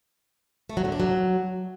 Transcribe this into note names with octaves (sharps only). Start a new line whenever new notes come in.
A3
F#3
D3
D4
F#3